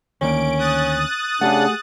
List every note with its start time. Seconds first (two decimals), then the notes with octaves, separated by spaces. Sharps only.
0.21 D2 D#3 A#3 C#4 D7
0.58 D#6 F#6 A6
1.41 C#3 A3 D4 G4 G#4 F#5